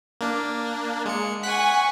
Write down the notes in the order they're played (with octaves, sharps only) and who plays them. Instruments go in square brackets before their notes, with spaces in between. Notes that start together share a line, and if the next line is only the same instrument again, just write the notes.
[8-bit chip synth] A#3 D4
G#3 C#7
[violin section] F#5 G#5 C#6 [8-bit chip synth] F#6 B6